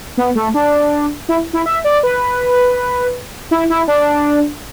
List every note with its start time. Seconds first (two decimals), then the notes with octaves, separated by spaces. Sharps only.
0.17 B3
0.35 A3
0.54 D4
1.29 E4
1.53 E4
1.66 E5
1.84 D5
2.03 B4
3.51 E4
3.70 E4
3.88 D4